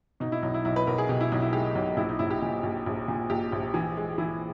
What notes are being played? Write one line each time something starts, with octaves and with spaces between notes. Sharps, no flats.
B2 D#4
E4
B1 D#4
E4
B1 E4
B4
B1 A#4
G#4
B2 G4
E4
B1 D#4
E4
G#3 G4
B1
A#1 E4
D#4
A#1 E4
G4
A#2
A#1
A#1
A#2
A#1 G4
A#1
E3
G#3
E3 E4